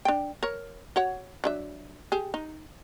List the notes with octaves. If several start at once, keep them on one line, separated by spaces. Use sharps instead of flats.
D4 G5
A#4 C#5
F#4 C#5 F#5
F#3 D4 E5
G4 G#4
D#4